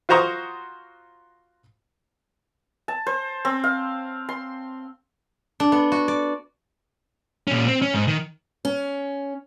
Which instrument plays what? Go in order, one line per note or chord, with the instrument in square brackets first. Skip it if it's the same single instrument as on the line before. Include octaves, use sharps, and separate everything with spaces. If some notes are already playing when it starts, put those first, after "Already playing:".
[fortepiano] F4 F#4 C5 A#5 C#6 D#6
[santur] A5
C5
C4
F5
C6
[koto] D4
B3
F#4
D5
[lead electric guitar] A#2 C#4
C4
C#4
G#2
D#3
[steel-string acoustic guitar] C#4